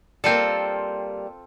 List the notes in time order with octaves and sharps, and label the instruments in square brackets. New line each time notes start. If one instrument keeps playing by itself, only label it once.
[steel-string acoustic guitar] G3 A#3 [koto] C4 F4 A4